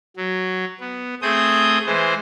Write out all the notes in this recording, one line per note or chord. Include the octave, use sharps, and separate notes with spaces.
F#3
B3
A3 C4 G#4 D#6 G6
E3 G#3 C5